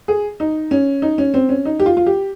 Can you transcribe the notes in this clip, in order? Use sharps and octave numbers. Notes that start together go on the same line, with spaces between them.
G#4
D#4
C#4
D#4
C#4
C4
C#4
D#4
G4
F4
F4
G4